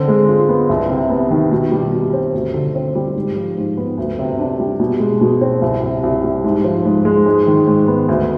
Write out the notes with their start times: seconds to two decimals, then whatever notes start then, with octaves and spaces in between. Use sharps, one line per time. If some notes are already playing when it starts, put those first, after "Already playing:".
Already playing: D3 C4
0.08 G#3
0.28 F4
0.49 B3
0.69 C2
0.90 C3
1.10 B3
1.31 D#3
1.52 B2
1.72 G3
1.92 B2
2.13 C4
2.33 D2
2.54 D3
2.75 C4
2.95 G3
3.16 G#2
3.36 F3
3.57 G#2
3.77 B3
3.98 D2
4.19 C3
4.39 D4
4.60 G3
4.80 B2
5.00 G#3
5.21 B2
5.41 C4
5.62 C2
5.83 C3
6.03 C2
6.24 G3
6.44 G#2
6.64 F3
6.85 G#2
7.05 G#3
7.26 G#2
7.47 D#3
7.67 G#2
7.88 B3
8.09 D2